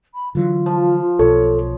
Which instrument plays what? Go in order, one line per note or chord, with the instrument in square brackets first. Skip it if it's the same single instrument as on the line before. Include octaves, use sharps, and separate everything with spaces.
[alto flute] B5
[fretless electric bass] D3 E3 F#3 [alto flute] F4
[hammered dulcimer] F3
[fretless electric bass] B1 B2 [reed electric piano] A4 [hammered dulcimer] C#5